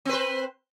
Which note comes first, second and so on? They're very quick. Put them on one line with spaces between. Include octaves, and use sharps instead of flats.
C4 B4 C5